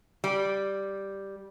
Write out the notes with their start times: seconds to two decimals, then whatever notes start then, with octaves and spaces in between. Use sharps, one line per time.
0.24 G3